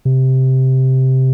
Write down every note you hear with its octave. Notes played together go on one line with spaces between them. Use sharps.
C3